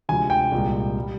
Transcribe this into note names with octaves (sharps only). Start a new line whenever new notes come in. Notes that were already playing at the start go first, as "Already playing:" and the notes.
D2 C3 F3 G#3 G#5
G5
C2 A#2 G#3
G3